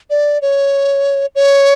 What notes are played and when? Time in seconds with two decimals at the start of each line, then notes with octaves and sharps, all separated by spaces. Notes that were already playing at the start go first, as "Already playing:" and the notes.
0.10 D5
0.42 C#5
1.35 C#5